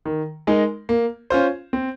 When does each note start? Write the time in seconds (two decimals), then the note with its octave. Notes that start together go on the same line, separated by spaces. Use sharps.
0.06 D#3
0.47 G#3 D#4 A#4
0.89 A#3
1.30 C#4 F4 C5
1.73 C4